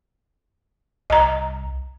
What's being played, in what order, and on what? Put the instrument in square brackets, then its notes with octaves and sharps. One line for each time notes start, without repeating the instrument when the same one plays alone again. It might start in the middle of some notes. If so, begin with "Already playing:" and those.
[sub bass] C2 [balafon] D#5 A#5